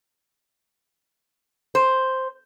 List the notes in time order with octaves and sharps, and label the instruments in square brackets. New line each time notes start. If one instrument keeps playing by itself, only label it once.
[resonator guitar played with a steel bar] C5